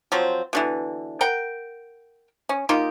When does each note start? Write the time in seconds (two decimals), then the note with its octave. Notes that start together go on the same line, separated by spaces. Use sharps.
0.12 F3 F#3 C4
0.53 B2 D3 E3
1.21 A#4 F#5 G5
2.49 C#4
2.69 A#3 D#4 F4 G4